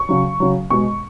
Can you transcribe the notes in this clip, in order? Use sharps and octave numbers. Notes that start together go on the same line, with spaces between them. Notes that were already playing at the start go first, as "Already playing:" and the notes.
Already playing: C#6
C#3 F#3
C#3 F#3
B2 G#3 C#6